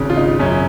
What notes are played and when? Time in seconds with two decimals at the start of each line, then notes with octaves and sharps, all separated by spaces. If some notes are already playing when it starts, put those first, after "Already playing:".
Already playing: G#1 C#3
0.10 F4
0.17 D#4
0.39 F#2 C#4